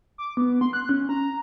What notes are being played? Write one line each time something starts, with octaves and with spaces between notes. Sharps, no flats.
D6
B3
C6
F#6
C#4
A#5